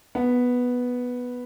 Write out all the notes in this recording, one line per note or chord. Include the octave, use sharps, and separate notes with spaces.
B3